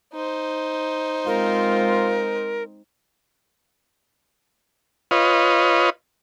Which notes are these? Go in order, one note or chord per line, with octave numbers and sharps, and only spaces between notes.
D#4 C5
G#3 C4 F4 A#4
F4 B4 C#5 D#5